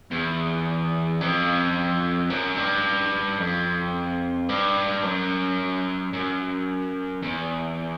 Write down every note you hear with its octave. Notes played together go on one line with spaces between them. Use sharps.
E2
F2
F#2
G2
F2
G2
F#2
F#2
E2